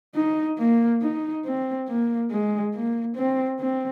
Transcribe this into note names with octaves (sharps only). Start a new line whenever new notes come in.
D#4
A#3
D#4
C4
A#3
G#3
A#3
C4
C4